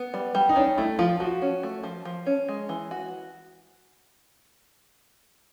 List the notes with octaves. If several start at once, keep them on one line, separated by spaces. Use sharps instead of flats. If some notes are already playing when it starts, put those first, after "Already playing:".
Already playing: B3
G3
G3
D#4
C#4 D4
A3 E4
F3 F4
F3 F#4
C#4
A3
F3
F3
C#4
G#3
E3
F#4